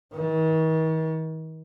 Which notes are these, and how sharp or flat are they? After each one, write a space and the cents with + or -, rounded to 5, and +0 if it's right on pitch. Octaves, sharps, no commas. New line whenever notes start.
D#3 +45